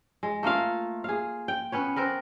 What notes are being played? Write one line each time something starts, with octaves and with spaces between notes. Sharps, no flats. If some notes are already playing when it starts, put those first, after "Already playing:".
G#3
A3 A#3 F4 F5
G#4 F5
G5
B3 C#4 B4 C#5
B3 C4 A#4 B4